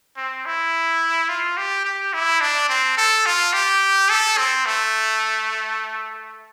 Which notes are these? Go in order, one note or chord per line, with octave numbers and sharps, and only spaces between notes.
C4
E4
F4
G4
G4
E4
D4
C4
A4
F4
G4
A4
C4
A3